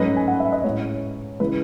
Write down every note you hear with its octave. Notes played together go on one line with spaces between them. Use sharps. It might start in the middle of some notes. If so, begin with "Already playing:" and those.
Already playing: G#2 F#3 A3 C#4 B4 D#5
G#5
F#5
E5
D#5
A2 G#3 C#4 C#5
C#3 E3 G#3 B4